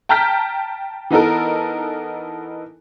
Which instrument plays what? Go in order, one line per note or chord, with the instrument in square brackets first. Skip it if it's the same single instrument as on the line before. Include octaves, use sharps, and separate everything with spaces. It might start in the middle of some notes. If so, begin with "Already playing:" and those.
[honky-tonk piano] G5 A5 A#5 F6 G6 B6
E3 B3 D#4 A4 A#4